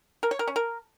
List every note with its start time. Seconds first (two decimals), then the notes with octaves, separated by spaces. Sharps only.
0.23 A#4
0.31 C#5
0.39 A#4
0.48 C#4
0.56 A#4